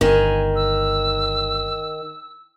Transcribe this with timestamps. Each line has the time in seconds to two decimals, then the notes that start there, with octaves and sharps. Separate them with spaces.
0.01 G1 D#3 G#5
0.56 E6